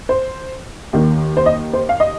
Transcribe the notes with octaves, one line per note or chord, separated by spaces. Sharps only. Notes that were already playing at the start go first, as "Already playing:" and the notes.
C5
D#2 D#3
C5
D#5
C5
F5
D#5